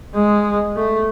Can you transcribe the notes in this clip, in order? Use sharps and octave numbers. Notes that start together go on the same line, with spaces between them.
G#3
A3